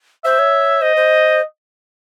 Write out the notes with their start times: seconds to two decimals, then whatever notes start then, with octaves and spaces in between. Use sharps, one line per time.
0.24 C5 E5
0.39 C#5
0.81 C5 D#5
0.96 C5